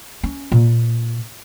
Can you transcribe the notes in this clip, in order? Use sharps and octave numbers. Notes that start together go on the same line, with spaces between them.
C#4
A#2